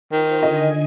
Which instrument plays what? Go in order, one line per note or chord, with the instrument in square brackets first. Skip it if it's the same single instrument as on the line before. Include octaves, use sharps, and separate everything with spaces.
[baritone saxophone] D#3 [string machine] D#4 F4 C5
[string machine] D3 G#5 [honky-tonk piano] D#5